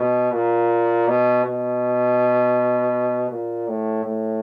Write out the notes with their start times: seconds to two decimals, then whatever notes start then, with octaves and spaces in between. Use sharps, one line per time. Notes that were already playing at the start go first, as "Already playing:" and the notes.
Already playing: B2
0.32 A#2
1.08 B2
1.45 B2
3.31 A#2
3.68 A2
4.05 A2